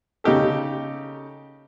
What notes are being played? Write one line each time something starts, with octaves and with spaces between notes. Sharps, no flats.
C#3 D#4 G4 A4